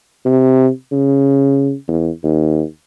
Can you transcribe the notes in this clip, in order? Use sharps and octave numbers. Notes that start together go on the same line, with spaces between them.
C3
C#3
E2
D#2